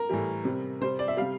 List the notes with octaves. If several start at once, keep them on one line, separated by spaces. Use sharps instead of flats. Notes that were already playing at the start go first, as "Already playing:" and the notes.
Already playing: A#4
A2 E3 G3
C3 G3
C3 G3 C5
D5
E5
C3 G3 F5